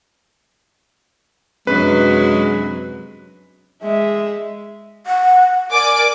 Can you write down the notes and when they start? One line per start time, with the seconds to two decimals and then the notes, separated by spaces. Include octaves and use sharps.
1.67 F#2 C3 F#3 G#3 C4 D4 B4
3.82 G#3 E5
5.07 F#5
5.71 A#4 D5 G#5 D6